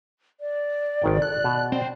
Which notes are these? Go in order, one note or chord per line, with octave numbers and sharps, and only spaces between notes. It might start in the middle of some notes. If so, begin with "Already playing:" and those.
D5
G#1 D#3 G5
A4 F#6
B2
C4